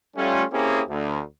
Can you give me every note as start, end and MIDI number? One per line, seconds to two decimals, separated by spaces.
0.16 0.43 55
0.16 0.43 57
0.16 0.43 61
0.16 0.43 65
0.51 0.81 58
0.51 0.81 60
0.51 0.81 61
0.51 0.81 64
0.51 0.81 67
0.51 0.81 68
0.88 1.20 38